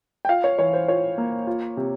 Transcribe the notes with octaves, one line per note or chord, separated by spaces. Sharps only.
G5
F4 F5
C#5
E3 C#5
C5
F4 C#5
A#3
F4
C3